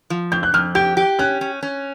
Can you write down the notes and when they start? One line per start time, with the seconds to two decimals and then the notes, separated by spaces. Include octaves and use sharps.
0.10 F3
0.32 F2 G6
0.43 F#6
0.54 F2 F6
0.75 G4 G6
0.97 G4
1.19 C#4 F#6
1.41 C#4
1.63 C#4